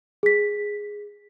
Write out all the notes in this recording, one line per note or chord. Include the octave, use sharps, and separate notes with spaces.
G#4 B6